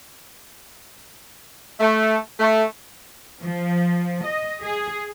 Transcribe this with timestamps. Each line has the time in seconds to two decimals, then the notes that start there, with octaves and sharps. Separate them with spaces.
1.80 A3
2.40 A3
3.43 F3
4.24 D#5
4.62 G#4